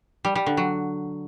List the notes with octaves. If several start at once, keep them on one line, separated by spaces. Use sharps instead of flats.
G3
G3
D3
F#3